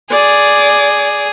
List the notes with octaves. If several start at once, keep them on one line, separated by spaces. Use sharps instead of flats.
G#4 D5